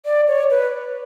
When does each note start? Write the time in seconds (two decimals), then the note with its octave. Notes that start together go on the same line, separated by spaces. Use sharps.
0.05 D5
0.28 C#5
0.50 B4